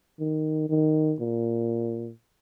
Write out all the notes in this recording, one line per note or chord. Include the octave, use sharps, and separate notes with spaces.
D#3
D#3
A#2